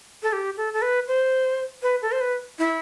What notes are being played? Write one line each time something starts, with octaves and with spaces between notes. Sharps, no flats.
A4
G4
A4
A4
B4
C5
B4
A4
C5
B4
E4